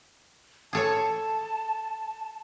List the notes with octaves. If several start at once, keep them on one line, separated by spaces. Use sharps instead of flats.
G#4 A4 C#5 A5